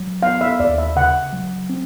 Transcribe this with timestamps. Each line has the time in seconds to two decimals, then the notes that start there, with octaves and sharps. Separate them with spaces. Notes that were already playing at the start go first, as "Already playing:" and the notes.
Already playing: F#3
0.23 B3 F5
0.41 E5
0.60 D#2 D5
0.78 E5
0.96 C#3 F#5
1.33 F#3
1.70 C4